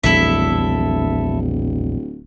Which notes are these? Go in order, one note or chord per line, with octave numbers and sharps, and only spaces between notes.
D1 A#1 E2 G3 E4 A4 E5